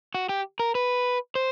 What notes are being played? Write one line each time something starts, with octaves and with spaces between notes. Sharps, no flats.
F#4
G4
A#4
B4
C5